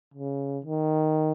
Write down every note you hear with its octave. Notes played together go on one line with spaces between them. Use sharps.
C#3
D#3